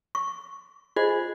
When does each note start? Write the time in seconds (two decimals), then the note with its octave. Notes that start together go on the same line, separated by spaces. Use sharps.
0.15 C#6
0.96 F4 G#4 C5 D#5